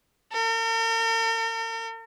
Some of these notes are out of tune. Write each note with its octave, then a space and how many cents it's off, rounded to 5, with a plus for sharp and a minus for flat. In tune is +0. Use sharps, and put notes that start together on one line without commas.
A#4 -45